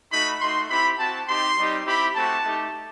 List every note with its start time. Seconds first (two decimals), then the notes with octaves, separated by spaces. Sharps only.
0.13 A3 D#4 F#4 B5
0.41 A3 D#4 F#4 C6
0.70 C4 E4 G4 B5
0.99 C4 F#4 A5
1.28 C4 D#4 G4 C6
1.57 G3 C4 D#4 G4
1.86 C4 E4 G4 B5
2.15 A3 C4 F#4 A5
2.44 A3 D#4 G4